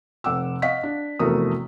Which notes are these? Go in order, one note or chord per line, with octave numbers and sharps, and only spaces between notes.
F1 F#5 D6 E6
D#5 F5 F#5 C#6 B6
D4
F1 E2 A3 F#4 A#4 D#6